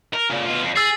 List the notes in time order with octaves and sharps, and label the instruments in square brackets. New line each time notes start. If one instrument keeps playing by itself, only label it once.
[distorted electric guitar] A#4
A#2 C#3
B2 F4
F2
[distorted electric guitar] G#4 [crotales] E6 A6 C7